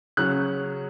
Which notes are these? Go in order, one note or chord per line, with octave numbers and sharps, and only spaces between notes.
C#3 F#3 C#4 F#6